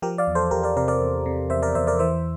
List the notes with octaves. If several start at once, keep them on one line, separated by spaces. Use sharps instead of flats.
F3 G4 A#4
D5 F5
E2
A4 C5
E2 G4 A#4
A#4 D5
C3 A#4 D5
A#4 D5
E2
C3
E2 C5 E5
A#4 D5
E2 C5 E5
A#4 D5
E3 C5 E5